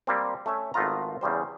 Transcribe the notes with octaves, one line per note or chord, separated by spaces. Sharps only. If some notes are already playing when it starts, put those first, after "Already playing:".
G3 A#3 C4
A3 C#4 C#5 E5
G#1 A3 B3 F4 A#5
E2 C#3 G3 C5